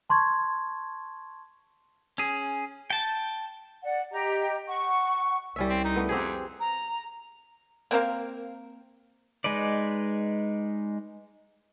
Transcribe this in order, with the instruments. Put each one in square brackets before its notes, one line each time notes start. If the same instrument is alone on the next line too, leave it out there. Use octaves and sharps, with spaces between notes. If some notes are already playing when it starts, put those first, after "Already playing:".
[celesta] A5 C6 C#6 G#6
[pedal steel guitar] C#4 G#4
G5 A5
[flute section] D5 F#5
G4 D#5 A#5
F#5 C#6
[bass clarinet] C2 [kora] G3 C#4 E5
[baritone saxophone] C4
D#4
[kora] A3 B3
[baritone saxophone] F2 [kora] C4 G4 G#4
[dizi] A#5
[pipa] A#3 C4 A#4 F5
[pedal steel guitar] G#3 D#4 B4 D5